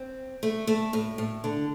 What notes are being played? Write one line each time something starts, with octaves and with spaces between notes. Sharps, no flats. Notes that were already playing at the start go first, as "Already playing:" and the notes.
Already playing: C4
A3
A3
A2
A2
D3